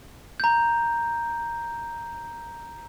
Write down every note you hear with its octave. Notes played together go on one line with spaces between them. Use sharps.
A#5 G6